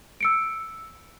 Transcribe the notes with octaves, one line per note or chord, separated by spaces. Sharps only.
E6 C#7 D7